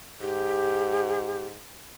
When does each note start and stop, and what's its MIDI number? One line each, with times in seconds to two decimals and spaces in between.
0.21 1.59 44
0.21 1.43 67